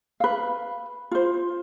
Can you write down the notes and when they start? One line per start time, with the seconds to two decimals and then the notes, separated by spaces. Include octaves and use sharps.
0.20 B4 F5
1.11 F4 C5